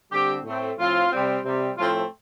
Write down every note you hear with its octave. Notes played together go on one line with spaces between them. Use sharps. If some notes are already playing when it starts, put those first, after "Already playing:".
D3 G3 C4 G4
A2 A3 C4
A2 F3 C4 F4
C3 G3 C4
C3 G3 C4
A2 F3 A3 C4 F4